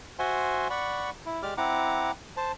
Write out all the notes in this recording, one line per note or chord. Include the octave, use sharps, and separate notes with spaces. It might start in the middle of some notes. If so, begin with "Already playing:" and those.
F#4 C5 E5 F#5 G#5 C6
D5 F#5 B5 C#6
E4
G#3 G4 D5 D6 F6
C4 E4 F#5 A#5 D6
C5 A5